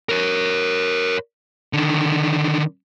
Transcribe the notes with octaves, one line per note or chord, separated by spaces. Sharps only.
A#4 C#5
D3 D#3